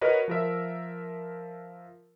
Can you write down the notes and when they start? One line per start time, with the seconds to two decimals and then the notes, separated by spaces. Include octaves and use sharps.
0.01 F#4 A#4 B4 C#5 D#5
0.28 F3 A#4 E5